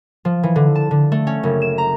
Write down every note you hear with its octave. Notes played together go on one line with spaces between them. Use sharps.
F3
E3
D3
A5
D3
A3
C#4
F#1
E7
A#5